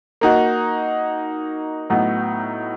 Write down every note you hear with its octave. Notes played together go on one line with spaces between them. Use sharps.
A#3 D#4 F#4
A2 F#3 B3 D#4